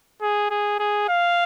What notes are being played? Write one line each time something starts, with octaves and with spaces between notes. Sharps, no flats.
G#4
G#4
G#4
F5